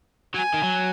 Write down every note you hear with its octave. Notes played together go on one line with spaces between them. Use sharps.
F#3 G#5
D#3
F#3